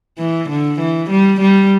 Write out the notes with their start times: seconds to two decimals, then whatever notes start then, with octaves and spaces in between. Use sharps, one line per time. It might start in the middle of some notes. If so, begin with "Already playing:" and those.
0.19 E3
0.49 D3
0.80 E3
1.10 G3
1.40 G3